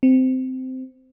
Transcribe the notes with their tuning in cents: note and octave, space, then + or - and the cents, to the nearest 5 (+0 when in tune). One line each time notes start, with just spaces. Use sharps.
C4 -15